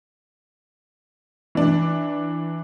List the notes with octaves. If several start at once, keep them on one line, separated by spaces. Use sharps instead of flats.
E3 D4